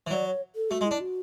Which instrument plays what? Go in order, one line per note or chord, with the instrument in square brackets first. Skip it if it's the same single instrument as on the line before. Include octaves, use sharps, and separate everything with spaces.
[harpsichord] E3
[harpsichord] F#3 [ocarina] D5
[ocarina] C#5
A4
[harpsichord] A3 [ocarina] F#4
[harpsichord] G#3
[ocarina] E4
[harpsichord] D4
[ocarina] F#4